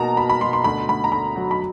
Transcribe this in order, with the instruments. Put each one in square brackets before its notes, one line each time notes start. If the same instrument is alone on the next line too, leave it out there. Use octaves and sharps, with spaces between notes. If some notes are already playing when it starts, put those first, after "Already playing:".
Already playing: [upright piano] B2 A#3 A5 A#5
B2 B5
B5
B2 C6
C6
D2 B5
D2 B5
A#5
D2 B5
F#3
B5